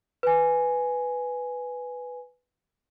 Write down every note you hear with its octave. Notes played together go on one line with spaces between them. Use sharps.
B4 G#5